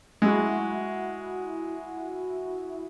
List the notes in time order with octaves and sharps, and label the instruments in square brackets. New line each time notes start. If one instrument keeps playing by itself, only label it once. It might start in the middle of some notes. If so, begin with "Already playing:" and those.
[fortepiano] G#3 [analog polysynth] E4 F#4